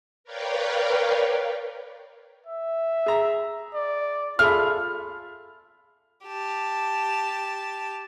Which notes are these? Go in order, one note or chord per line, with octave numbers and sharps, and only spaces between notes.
A#4 B4 C#5 D5 F5 G5
E5
G#4 A#5
D5
F4 G#4 A4 E5 B5 F6
G4 A5